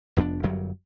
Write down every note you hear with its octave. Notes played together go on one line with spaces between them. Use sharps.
F1 F2 B3 D4
G1 F#2 F#3 G3